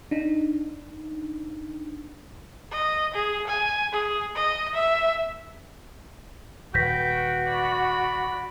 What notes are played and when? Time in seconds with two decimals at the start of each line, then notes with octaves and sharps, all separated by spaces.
0.11 D4 D#4
2.72 D#5
3.14 G#4
3.48 G#5
3.92 G#4
4.36 D#5
4.74 E5
6.74 D#1 F#4 B4 G5 G6 A#6 B6
7.48 D5 B5